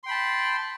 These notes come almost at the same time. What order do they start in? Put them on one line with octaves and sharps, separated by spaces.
C6 G5 B5 A5